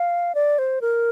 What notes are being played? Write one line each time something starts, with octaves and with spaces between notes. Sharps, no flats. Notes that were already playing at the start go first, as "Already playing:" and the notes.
Already playing: F5
D5
C5
A#4